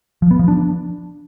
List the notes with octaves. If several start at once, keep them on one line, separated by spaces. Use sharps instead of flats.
F3
B3
F3
D4